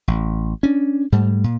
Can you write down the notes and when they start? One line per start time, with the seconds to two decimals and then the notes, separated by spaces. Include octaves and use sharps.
0.08 A1
0.63 C#4 D4
1.12 G#2 G3 A3
1.44 A#2